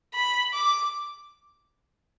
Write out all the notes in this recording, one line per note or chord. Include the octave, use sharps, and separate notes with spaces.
B5
D6